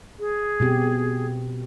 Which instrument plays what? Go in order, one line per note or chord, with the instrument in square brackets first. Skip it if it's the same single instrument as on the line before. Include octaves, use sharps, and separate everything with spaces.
[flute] G#4
[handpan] B2 C4 G4